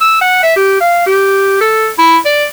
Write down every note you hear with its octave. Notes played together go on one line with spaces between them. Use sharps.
E6
F#5
E5
G4
F5
G4
A4
E4
D5